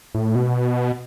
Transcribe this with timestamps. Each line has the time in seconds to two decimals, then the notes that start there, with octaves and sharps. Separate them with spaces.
0.15 A2
0.35 B2